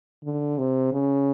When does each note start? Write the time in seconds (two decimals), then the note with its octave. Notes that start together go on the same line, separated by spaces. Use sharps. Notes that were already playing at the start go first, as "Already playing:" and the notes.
0.24 D3
0.58 C3
0.92 C#3